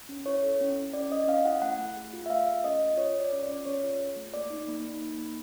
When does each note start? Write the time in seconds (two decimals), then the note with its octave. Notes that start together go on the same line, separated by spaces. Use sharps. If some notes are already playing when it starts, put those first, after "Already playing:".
0.09 C#4
0.26 E4 C#5
0.43 A4
0.61 C#4
0.77 E4
0.93 C#4 D5
1.10 C#4 D#5
1.28 C#4 F5
1.45 E4 F#5
1.62 A3 F#5
1.79 A3
1.97 G#4
2.13 F4
2.26 E5
2.30 A3 F5
2.47 G#4
2.64 C#4 D#5
2.81 F4
2.97 F4 C#5
3.15 F4 D5
3.32 C#4
3.43 D5
3.49 C#4
3.66 C#4 C#5
3.83 F4
3.99 G#4
4.16 A3
4.34 A#3 D5
4.50 D#4
4.68 A#3
4.84 D#4
5.02 A#3
5.18 A#3